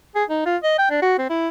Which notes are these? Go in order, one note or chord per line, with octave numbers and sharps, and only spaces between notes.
G#4
D#4
F4
D#5
G5
D4
F#4
C4
E4